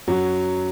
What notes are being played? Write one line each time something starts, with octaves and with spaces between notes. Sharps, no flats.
F#2 F#3